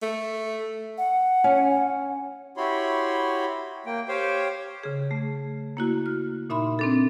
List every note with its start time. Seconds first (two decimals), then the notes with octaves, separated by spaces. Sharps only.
0.02 A3
0.98 F#5
1.44 C#4 G#5
2.57 E4 F#4 G4 C#5 B5 C6
3.86 A#3 G5
4.08 G4 C5 C#5 F5 G5
4.83 C#3 G#4
5.11 A3
5.77 A#3 E4 F#4
6.06 F6
6.50 A#2 D#4 E5 B5 C6
6.79 C4 D4 A4